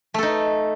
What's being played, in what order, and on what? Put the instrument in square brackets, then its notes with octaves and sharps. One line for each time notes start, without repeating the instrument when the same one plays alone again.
[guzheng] A3
A4
D#4